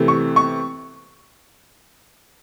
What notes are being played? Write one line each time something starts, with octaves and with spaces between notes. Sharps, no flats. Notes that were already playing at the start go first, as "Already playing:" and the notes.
Already playing: C3 E3 A3
C#6
C#6